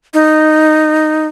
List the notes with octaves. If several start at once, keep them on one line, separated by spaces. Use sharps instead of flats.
D#4